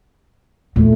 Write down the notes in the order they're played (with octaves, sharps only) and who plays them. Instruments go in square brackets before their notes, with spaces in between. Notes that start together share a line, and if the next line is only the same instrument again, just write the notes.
[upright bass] E2 [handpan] A#2 A3